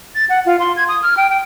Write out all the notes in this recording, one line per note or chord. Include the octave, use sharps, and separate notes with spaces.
A6
F#5
F4
C6
G#6
D#6
F6
G5
G5